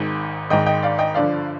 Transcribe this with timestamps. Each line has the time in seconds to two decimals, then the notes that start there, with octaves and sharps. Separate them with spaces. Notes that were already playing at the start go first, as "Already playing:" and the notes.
Already playing: G#1 G#2 D#3
0.50 G#1 G#2 D#3 D#5 G5
0.66 D#5 G5
0.83 D5 F5
0.99 D#5 G5
1.14 G1 G2 D3 F3 D5 F5